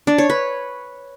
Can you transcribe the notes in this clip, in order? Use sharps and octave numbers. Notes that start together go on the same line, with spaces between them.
D4
C#5
B4